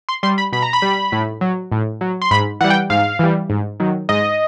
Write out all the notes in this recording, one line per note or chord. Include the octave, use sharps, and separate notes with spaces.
C6
G3 C6
B5
B2 B5
A#5
B5
G3
A2
F#3
A2
F#3
C6
G#2 B5
E3 G3 F#5
G5
G#2 F5
E3 G3
G#2
D#3 F#3
G#2 D#5